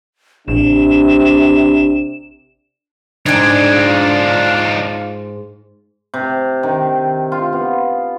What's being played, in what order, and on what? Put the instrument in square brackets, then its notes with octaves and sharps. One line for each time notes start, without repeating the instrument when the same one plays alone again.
[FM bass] A1 [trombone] C3 [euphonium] D4 [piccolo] E7
[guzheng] G#2 G5 [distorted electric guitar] D4 D#4 [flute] G#6
[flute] F4
[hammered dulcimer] C3
D#3
F4
B3